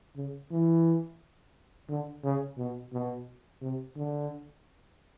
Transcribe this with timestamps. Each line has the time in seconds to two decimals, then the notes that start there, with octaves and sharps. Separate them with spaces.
0.16 C#3
0.51 E3
1.89 D3
2.23 C#3
2.58 B2
2.93 B2
3.61 C3
3.96 D3